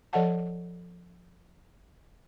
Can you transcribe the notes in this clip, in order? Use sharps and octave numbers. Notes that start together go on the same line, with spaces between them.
F3 A4 D5 D#5 F#5 A5